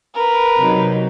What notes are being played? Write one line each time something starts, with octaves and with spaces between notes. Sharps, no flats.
A#4 B4
C3 F#3 D#4